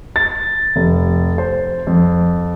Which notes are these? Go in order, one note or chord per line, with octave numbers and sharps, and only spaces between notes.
A6
F1
C5
F2